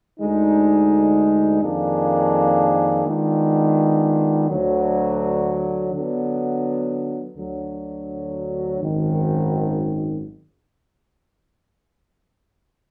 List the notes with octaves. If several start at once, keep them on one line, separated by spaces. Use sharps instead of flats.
D2 D3 G#3 D#4
F2 D#3 A#3 D4 G#4
D#3 G#3 B3 D4 F4
D2 D3 F#3
D3 F#3 B3
D2 D3 F#3
G#1 F#2 D#3